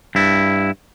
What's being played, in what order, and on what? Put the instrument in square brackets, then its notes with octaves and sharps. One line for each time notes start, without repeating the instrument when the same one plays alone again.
[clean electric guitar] G2 E4